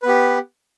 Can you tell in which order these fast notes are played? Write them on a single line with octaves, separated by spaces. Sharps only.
B4 B3 G4